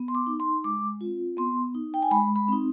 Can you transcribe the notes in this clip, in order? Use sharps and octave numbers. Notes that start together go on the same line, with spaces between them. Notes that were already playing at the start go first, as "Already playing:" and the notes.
Already playing: B3
C6
D6
D#4
C6
G#3 D6
C4 F4
B3 C6
D#4
G5
G#5
G#3 B5
B5
C4 D#4